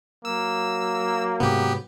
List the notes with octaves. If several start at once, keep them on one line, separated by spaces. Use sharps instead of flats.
F#3 A#3 E6
G#2 C3 B3 G4